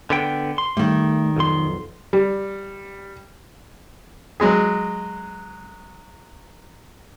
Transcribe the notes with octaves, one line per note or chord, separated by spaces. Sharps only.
D3 B3 G5
C6
D#3 G3 A3
B1 F2 C6
G3
F#3 G#3 G#4